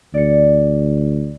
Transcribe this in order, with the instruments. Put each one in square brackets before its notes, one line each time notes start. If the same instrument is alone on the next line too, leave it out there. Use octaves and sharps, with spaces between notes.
[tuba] D2 [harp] D5 C#7